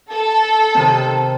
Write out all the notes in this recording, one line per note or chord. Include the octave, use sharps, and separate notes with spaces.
A4
C3 D#3 C4